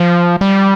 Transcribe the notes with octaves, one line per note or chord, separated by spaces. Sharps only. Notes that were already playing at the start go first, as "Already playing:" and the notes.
Already playing: F3
G3